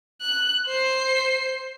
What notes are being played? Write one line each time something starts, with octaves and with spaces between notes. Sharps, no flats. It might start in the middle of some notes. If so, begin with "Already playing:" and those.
F#6
C5 C7